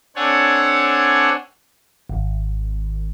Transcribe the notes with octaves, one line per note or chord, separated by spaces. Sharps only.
C4 D4 A4 C#5 F#5 G#5
G#1